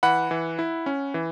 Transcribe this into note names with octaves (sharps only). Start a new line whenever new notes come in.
E3 F#5 B5
E3
E4
C#4
E3